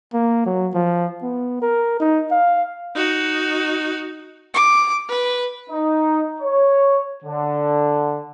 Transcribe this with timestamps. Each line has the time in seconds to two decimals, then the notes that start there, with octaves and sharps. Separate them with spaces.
0.14 A#3
0.46 F#3
0.74 F3
1.23 B3
1.62 A#4
2.00 D#4
2.31 F5
2.95 D#4 F#4
4.54 D6
5.09 B4
5.70 D#4
6.41 C#5
7.25 D3